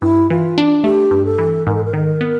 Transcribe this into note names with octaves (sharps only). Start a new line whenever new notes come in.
G2 E4
E3 F4
D4
A3 G4
G2
A4
E3
G#2 A#4
A4
A#4
D#3
B3